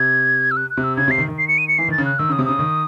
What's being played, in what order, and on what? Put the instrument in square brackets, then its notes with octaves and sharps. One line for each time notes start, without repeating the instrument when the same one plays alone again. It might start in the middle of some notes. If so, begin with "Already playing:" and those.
Already playing: [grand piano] C3 [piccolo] G#6
[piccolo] E6
F#6
F#6
[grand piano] C3
[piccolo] E6
[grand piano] C#3 [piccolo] G#6
[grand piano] C3 [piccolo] C7
[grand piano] D#3
D#3
[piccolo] C7
C#7
D#7
C#7
[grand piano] E3 [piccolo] C7
[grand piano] D#3 [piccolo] A6
[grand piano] C#3
[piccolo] F#6
[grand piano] D#3 [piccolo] E6
[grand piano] C#3 [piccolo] D#6
[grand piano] C3
[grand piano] C#3 [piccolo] D#6
[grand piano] D#3